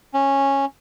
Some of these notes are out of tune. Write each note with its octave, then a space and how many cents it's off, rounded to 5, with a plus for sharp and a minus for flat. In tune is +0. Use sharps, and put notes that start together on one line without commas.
C#4 -10